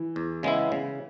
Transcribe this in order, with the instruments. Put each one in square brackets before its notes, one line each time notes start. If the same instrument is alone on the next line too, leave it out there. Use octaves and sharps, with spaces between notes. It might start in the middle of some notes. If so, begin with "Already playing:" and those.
Already playing: [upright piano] E3 E4
[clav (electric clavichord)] E2
C#3 G#3 B3 E4
C#3